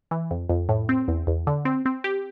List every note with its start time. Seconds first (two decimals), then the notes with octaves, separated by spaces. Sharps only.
0.11 E3
0.31 F2
0.49 F2
0.69 A2
0.89 C4
1.08 E2
1.27 E2
1.47 D3
1.65 C4
1.86 C4
2.04 G4